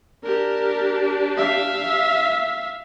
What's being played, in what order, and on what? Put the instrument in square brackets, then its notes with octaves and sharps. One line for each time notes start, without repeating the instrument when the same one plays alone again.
[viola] D4 G4 [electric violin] A#4
[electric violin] E5 F5